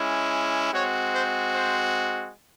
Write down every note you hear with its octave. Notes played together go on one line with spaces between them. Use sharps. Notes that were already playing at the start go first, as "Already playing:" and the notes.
Already playing: G#3 C#4 E4
G#3 C4 F#4 C#5
C5
C5